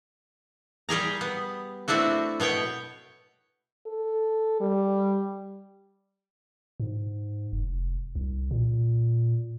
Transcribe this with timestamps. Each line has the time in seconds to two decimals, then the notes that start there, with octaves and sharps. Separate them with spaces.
0.89 G3 G4 G#4 A#5
1.21 B3
1.88 A3 C4 D4 E4 F#4
2.40 B2 B3 C#5 G5
3.87 A4
4.60 G3
6.80 G#2
7.53 F1
8.15 C2
8.51 A#2